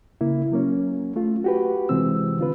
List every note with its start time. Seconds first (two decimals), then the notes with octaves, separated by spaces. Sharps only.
0.21 C#3 A#3 E4
0.52 F#3 A#3 C#4
1.16 A3 F4
1.44 F#4 G4 B4
1.89 C3 E3 G#3 C4 E6
2.39 D3 F4 B4